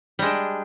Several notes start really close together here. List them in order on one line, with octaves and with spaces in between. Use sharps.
G3 G#3 D4